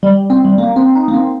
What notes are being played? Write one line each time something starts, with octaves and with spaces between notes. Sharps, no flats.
G3
C4
G3
A#3
C4
D#4
A#3
C4